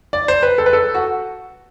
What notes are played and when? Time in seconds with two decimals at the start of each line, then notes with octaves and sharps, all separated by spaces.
0.13 D5
0.28 C5
0.43 B4
0.58 A4
0.66 B4
0.73 A4
0.95 F#4